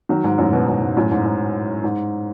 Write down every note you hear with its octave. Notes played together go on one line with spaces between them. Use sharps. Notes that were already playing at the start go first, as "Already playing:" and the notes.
D#3 F#3
G#2
F#2 A2
G#2 B2
F#2
G#2
F#2 A2
G#2
G#2
G#2